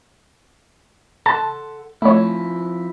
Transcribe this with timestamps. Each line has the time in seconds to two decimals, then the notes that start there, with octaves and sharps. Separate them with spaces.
1.26 A4 F#5 A5 C6
2.02 F3 A3 C4 E4 C#5